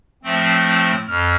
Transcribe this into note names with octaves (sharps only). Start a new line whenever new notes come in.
A2 F3 A3 C4
F2 F6